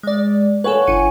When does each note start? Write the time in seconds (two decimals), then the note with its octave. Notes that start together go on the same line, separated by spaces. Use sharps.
0.03 G#3 D5
0.64 A4 B4 C#5 F#5 G#5
0.87 G1 C#7 D#7